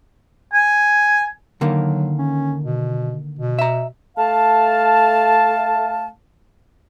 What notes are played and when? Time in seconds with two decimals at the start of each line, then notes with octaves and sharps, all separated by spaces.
0.53 G#5
1.61 D3 D#3 F#3 A#3
2.18 C#4
2.64 B2
3.39 B2
3.59 E5 A#5
4.17 A3 F5 A5